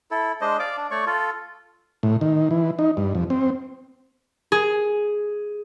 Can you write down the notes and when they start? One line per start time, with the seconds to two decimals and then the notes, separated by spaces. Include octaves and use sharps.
0.11 E4 A4
0.41 G#3 D4 C5 D#5
0.59 D5 F5 D6
0.77 D4
0.91 A3 C#5 D5 C#6
1.06 F4 A4
2.03 A2
2.21 D#3
2.51 E3
2.79 D#4
2.97 G2
3.15 F2
3.30 C4
4.52 G#4